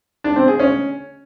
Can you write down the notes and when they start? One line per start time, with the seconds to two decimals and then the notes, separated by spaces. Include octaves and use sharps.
0.24 D4
0.36 C4
0.48 G#4
0.59 C#4